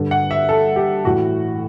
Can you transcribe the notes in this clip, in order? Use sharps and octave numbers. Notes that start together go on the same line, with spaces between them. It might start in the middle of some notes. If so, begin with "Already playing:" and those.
Already playing: G2 D3
F#5
E5
A4
G4
A2 E3 F#4